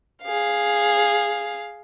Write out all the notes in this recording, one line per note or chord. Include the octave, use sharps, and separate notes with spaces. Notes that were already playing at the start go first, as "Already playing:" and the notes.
G#4 F5